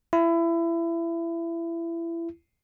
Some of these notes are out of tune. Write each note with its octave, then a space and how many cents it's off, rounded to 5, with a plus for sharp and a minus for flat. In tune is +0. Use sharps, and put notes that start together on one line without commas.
E4 +25